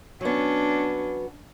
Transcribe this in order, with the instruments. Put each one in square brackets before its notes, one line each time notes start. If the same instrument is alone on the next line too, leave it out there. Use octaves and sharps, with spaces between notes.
[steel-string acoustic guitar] F#3 B3 [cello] C#4 D4